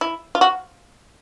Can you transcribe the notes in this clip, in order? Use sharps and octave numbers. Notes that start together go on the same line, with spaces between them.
E4
F4
F#4